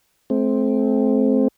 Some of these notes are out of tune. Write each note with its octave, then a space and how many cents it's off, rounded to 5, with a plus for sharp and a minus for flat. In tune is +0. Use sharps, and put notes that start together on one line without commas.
A3 -35 C4 +5